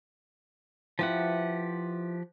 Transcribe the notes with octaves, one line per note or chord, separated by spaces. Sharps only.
F3 E4 F4 G4 B4 F#5